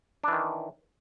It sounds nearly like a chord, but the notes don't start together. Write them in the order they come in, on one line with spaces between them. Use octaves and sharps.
D4 E3 D#3